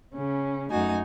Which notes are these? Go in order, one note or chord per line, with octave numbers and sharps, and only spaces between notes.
C#3 C#4
F#2 A3 D#4 F#4 G#5